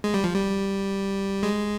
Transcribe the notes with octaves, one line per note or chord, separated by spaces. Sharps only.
G#3
G3
F3
G3
G#3